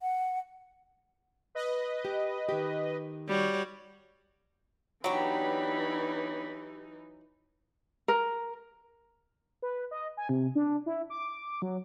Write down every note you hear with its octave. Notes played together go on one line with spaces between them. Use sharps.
F#5
B4 D#5
G4
D#3 G4
G3 F#4 C#5
E3 F#3 B3 D4 D#4 G4 C#5 B5
A#4
B4
D#5
G#5
C3
D4
E4
D6
F#3